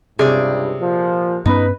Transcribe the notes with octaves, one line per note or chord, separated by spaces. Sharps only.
C#2 G2 C3 G#4 D5
A#2 F3
G2 B3 C#4 D#4 B4